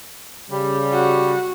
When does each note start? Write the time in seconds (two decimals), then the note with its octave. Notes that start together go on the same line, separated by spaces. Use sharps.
0.51 C#3 G3
0.92 F#4